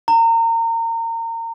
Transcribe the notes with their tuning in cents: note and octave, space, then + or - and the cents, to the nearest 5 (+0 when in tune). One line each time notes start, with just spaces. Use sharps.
A#5 -30